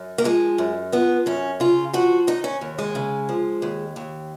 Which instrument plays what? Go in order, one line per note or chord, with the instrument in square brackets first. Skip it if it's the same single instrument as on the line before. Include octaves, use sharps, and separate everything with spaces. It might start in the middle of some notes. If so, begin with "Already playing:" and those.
Already playing: [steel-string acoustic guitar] F#2
A#3
F3 G#3
F#2
F3 B3
F#2 C#4
C#3 F4
F3 F#4
D#2 D#4
C#4
D#2
G#3
C#3
F3
D#2
D#2